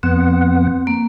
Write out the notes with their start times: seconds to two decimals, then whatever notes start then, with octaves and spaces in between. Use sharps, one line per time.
0.03 F2 B3 C4 F#5
0.87 A#3